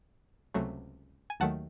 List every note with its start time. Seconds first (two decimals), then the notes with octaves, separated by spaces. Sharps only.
0.54 C#2 C3 F#3 A3
1.30 G#5
1.40 D#2 D#3 F#3 A3 F#5 A5